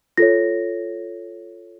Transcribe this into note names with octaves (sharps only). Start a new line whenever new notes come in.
F4 A4 C#5 A#6